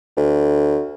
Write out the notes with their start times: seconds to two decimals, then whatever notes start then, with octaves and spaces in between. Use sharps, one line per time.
0.17 D2